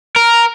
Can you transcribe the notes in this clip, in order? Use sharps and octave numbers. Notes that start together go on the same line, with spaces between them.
A#4